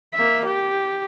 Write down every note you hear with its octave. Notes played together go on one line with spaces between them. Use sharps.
A#3 E5
G4